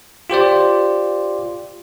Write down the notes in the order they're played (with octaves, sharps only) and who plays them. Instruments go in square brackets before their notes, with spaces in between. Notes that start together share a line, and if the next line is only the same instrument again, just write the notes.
[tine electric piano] F4 G4 C5 D5